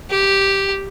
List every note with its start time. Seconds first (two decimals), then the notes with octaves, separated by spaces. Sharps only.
0.10 G4